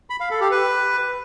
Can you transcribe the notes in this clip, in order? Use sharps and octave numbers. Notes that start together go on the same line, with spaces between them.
B5
F5
A4
G4
B4